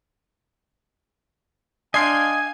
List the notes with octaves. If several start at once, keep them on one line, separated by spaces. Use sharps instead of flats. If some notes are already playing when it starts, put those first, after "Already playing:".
D4 D#5 F5 G5 G#5 C6 G#6 C7